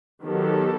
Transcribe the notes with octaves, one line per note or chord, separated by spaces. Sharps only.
D#3 F#3 B3 G4 A4